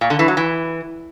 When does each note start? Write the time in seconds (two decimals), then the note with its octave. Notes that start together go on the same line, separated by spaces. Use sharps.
0.01 A#2
0.10 D3
0.19 E3
0.28 F#3
0.37 E3